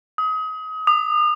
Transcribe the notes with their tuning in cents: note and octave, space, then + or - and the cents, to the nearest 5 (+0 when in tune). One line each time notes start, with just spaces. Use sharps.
D#6 +30
D#6 -40